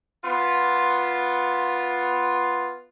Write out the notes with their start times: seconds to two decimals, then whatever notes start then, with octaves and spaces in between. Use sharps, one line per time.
0.24 B3 F4